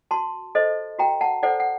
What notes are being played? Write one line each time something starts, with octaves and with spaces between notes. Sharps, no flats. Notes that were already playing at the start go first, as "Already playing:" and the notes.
F#4 A5 C6
A4 C5 D#5
F#4 G5 A#5
F#5 A5
A4 C5 D5 F#5
F#5